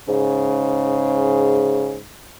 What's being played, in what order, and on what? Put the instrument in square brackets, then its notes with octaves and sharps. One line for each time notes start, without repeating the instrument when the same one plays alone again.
[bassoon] G#2 [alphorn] C#3